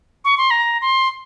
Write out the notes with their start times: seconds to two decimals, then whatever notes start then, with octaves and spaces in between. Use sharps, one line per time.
0.25 C#6
0.38 C6
0.51 A#5
0.82 C6